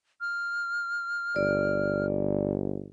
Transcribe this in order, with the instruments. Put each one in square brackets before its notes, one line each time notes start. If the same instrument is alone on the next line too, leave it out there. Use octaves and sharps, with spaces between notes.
[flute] F6
[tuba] G1 [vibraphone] D5